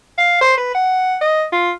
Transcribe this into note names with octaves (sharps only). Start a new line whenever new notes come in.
F5
C5
B4
F#5
D#5
F4